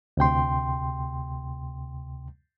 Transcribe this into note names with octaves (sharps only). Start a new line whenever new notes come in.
D2 C3 G5 C6